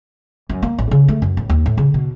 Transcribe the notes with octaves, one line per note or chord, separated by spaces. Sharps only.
F#2
A#3
A1
C#3
A3
F#2
A1
D#2
A2
C#3
B2